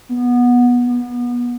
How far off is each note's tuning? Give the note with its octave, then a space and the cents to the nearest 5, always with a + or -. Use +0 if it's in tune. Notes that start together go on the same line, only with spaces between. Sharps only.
B3 -15
B3 -30